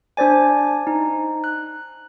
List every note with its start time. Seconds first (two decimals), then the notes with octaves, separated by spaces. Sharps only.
0.17 D4 C5 D5 G#5
0.87 D#4
1.44 F#6